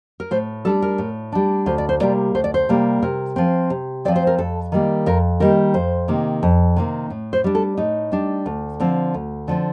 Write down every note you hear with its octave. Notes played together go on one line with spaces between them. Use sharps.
A#4
A2 C5
G3 D4 A4
A#4
A2
G3 D4
D2 C5
D5
C5
C3 G3 A#3 D5
D2 C5
D5
C5
C3 G3 A#3
C3 A#4
F3 C4
C3
F3 C4 D5
C5
A#4
F2 A4
D#3 G3 A#3
F2 A#4
D#3 G3 A#3 A#4
F2 C5
C3 D#3 A#3
F2
C3 D#3 A#3
A2
C5
G3 D4
A4
A2 D#4
G3 D4
D2
D3 F3 C4
D2
D3 F3 C4